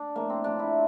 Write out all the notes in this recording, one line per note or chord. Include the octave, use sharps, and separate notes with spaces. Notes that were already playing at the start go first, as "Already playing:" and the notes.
Already playing: D4
A2 F3 A#3
C4
A2 F3 D4
E4